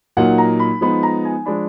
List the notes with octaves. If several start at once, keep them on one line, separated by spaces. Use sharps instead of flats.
A#2 F#3 A#3 D#4 F#5
A#5
B5
F3 G#3 B3 D#4 B5
A#5
G#5
F3 G#3 D4 B5